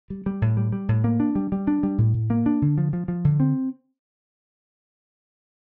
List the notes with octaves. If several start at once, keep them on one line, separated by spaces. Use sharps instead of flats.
G3
G3
A2
G3
G3
A2
A#3
D4
G3
G3
D4
G3
A2
A2
A#3
D4
D3
F3
F3
F3
D3
C4